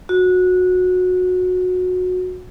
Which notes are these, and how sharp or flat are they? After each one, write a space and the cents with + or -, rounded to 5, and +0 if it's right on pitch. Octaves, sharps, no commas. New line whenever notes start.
F#4 -20